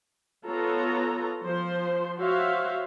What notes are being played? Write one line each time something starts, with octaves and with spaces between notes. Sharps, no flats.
B3 F4 A4 C#5 A#5
F3 C5
F#4 C5 C#5 E5 F5